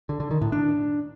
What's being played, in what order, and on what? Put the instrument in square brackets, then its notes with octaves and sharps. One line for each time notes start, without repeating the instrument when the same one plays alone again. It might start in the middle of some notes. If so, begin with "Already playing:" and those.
[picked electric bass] D3
D3
D#3
A2
D4